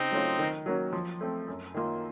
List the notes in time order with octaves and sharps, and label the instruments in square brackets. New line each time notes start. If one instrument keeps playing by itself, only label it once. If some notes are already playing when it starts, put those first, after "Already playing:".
Already playing: [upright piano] C#3 [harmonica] C4 D#4
[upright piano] F#3 A3 C#4 F4
D#3
F#3 A#3 C#4 F#4
F3
A3 C4
F#2
D#3 A#3 F4